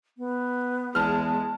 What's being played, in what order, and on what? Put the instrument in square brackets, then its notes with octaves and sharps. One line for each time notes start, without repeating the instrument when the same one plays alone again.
[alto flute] B3
[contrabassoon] E2 [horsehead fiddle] G#3 [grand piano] A5 F6